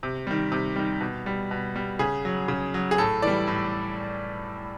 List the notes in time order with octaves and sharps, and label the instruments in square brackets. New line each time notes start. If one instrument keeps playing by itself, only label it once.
[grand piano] C3
D#3 G3
C3
D#3 G3
B2
G3
B2
G3
C#3 G#4
F#3
C#3
F#3
G#4
A2 A4
E3 G3 D5
A2